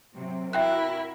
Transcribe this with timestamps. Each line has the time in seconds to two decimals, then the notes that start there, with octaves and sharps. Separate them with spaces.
0.14 C3 F#3 C4
0.53 E4 F#4 A#4 E5 G5 F#6